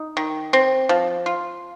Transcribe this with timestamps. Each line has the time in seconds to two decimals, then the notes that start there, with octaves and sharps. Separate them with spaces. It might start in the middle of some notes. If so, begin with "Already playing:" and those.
Already playing: D#4
0.17 D#3
0.53 C4
0.89 F3
1.26 F4